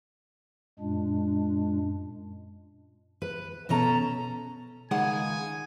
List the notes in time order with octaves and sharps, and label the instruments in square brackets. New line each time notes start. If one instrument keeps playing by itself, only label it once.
[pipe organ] F#2 A#2 G#3 D4
[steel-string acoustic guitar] B4
B2 C#4 A4 A#5
[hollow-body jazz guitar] C#2 D#3 G#3 [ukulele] F#5 [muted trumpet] G#5